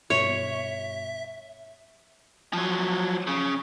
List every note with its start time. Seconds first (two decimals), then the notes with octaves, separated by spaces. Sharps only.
0.10 G2 B2 C#5 E5
2.53 F3 F#3
3.27 C#3